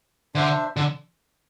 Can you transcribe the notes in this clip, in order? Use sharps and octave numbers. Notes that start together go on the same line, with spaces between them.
D3 D4 C5 E5
D3